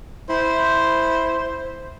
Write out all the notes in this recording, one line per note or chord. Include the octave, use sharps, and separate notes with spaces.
E4 C5